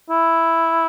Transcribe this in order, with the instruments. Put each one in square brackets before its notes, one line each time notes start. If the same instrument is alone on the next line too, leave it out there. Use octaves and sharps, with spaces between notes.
[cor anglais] E4